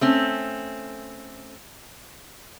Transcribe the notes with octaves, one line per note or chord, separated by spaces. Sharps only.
A3 C4 C#4